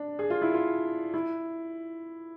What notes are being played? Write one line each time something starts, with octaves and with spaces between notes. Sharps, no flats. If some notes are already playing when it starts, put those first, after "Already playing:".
Already playing: D4
G#4
F4
E4
F4
E4